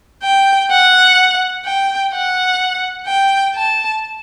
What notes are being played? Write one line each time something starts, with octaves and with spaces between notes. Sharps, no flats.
G5
F#5
G5
F#5
G5
A5